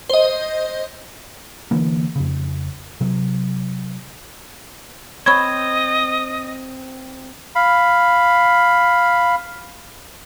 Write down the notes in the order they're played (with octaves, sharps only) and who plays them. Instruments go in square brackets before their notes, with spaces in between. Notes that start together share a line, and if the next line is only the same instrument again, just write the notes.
[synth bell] C5 D#5
[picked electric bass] D3 E3 A#3
F2 C#3
C3 F#3
[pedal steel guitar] C4 C5 [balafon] C#5 B5 C#6 [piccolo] D#5 [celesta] G#6
[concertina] F5 B5